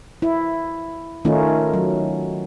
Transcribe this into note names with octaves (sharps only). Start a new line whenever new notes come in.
E4
D#3 A3 C#4 D#4 F4
F#3